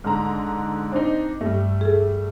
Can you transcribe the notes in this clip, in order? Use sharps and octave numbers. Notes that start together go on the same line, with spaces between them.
G#2 D3 A#5
C4 D4 D#4
G2 G3 A3
G#4 A4